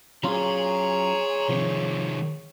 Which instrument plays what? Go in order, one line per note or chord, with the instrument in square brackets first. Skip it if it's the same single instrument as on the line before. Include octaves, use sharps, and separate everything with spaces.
[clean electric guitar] F#3 C#4 F4 [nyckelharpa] G#4 C#5 [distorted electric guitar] A#5 C6
[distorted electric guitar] C3 D#3 [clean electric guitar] F3